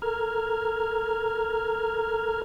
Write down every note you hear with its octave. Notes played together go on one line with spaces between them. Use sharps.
A4 A#4 A#5 F6 G#6